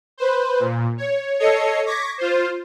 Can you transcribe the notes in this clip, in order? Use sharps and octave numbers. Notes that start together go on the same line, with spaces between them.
B4 C5
A#2
C#5
A4 C#5 D#5 C7 C#7
C#6 D6 G#6 A#6 B6
F4 C5